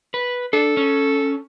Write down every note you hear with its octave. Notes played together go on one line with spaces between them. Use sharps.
B4
D4 A4
C#4